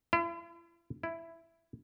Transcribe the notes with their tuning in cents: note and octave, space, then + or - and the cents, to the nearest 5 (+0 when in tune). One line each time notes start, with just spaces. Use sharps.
E4 +45
E4 +10